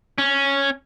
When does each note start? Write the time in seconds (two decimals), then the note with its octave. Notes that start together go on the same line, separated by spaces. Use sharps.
0.18 C#4